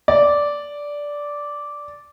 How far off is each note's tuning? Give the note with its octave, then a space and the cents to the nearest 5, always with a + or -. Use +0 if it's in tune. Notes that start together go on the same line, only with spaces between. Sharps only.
D5 -10